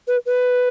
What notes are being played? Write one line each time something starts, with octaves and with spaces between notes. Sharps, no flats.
B4
B4